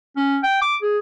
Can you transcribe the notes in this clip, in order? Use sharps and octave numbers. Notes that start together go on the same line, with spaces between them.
C#4
G5
D6
G#4